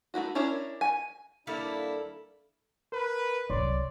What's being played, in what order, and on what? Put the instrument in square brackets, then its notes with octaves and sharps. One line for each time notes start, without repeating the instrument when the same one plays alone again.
[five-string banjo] A3 D#4 E4 F#4
C#4 D4 E4 A#4 C#5
G#5
[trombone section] D#2 A#3 D4 [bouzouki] G3 A4 F5 [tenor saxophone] E4
[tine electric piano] A#4 [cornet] B4
[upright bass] C2 F#3 [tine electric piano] C#5 C6 [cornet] D5